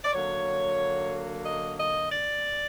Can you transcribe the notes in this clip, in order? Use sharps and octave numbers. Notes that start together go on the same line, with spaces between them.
D5
D3 F#3 A#3 C#5
D#5
D#5
D5